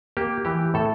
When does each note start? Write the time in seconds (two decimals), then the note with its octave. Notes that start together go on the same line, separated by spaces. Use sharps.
0.17 A#3 G4
0.45 E3 G4
0.74 A2 A4